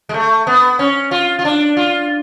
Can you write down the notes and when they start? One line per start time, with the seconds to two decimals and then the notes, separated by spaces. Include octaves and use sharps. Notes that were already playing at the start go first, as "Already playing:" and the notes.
0.09 G#3
0.14 A3
0.47 B3
0.79 C#4
1.11 F4
1.39 F4
1.45 D4
1.77 F4